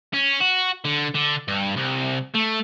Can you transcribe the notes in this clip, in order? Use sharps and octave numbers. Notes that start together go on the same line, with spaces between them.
C#4
F#4
D3
D3
G2
C2
A3